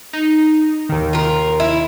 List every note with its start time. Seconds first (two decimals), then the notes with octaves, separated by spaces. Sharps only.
0.13 D#4
0.89 D#2 D#3
1.13 F4 A#4
1.60 E4